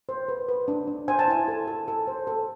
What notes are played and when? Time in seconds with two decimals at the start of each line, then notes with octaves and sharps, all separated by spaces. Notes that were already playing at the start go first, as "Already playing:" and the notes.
0.09 C5
0.28 B4
0.49 B4
0.68 D4
0.88 D4
1.08 C5 G#5
1.19 A5
1.28 E4 G#5
1.48 A4
1.67 A4
1.88 A4
2.07 C5
2.27 A4